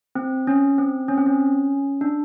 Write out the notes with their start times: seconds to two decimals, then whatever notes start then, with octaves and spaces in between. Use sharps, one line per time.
0.15 C4
0.47 C#4
0.78 C4
1.08 C#4
1.17 C4
1.26 C#4
2.01 D4